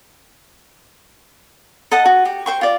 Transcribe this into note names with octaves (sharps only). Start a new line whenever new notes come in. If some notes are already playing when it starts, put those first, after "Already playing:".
A4 D#5 F#5 A5
F#4
G4
C5 G5 C#6
F4 D5